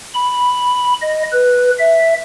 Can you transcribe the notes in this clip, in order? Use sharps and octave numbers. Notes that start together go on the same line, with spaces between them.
B5
D#5
B4
E5